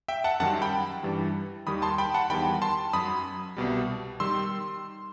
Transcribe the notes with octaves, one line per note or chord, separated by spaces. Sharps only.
E5 G5
F#5 A5
F#2 D#3 G3 F#5 A5
G5 B5
G2 E3 G3
D#2 D#3 G3 B5 D#6
A5 C6
G5 B5
F#5 A5
E2 D#3 G3 G5 B5
A5 C6
F#2 F#3 B5 D#6
C2 B2 G3
D#3 G3 C6 E6